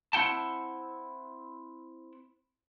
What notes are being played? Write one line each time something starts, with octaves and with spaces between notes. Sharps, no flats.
C4 E4 F#5 G5 A5